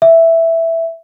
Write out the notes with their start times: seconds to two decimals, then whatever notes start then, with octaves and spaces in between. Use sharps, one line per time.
0.02 E5